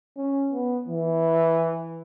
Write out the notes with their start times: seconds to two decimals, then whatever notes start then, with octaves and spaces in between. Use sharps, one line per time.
0.17 C#4
0.52 B3
0.88 E3